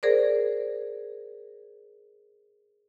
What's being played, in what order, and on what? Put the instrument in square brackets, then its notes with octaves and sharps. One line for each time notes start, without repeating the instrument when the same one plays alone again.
[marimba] G#4 A#4 C5 D5